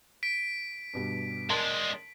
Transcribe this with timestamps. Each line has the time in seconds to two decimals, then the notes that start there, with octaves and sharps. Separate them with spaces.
0.23 B6 D7
0.93 G2 B2 G3
1.50 G#3 D4 A#4 A5 C6